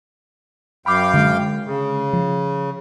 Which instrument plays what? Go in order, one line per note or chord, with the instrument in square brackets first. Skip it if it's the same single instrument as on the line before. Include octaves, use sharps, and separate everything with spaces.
[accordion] F#2 F5 G5 [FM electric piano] B5 D6
[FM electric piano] D3 G#3
[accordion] C#3
[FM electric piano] F3